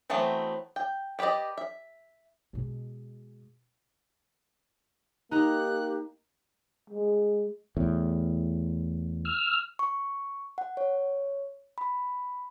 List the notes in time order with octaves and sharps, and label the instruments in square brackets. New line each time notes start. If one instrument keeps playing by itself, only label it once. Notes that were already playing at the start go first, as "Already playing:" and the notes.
[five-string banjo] E3 F#3 A3 B3 C4
G5
B3 G4 B4 D5 D#5
E5
[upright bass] B2 G#3
[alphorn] A#3 [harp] D#4 A#5 [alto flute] G4 [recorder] F#6
[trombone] G#3
[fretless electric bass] E2 A2
[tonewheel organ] E6 F6
[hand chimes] C#6
F#5
C#5
B5